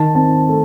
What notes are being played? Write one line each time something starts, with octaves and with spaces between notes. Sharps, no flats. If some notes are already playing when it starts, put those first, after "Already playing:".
Already playing: D#3 A5
C4 A5
A3